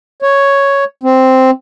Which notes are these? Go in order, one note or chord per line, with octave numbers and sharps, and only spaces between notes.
C#5
C4